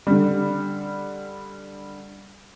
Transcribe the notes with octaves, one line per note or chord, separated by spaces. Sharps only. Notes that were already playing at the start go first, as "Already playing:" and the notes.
D3 G3